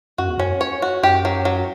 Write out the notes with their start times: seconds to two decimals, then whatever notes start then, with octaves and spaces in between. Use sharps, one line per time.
0.18 F#2 F#4
0.28 E2
0.38 F#2 C#4
0.61 C#5
0.82 F#4
1.03 F#2 G4
1.25 F#3
1.45 F#3